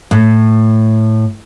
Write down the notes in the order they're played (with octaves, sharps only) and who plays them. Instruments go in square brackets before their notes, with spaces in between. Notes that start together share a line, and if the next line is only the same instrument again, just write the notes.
[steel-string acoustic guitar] A2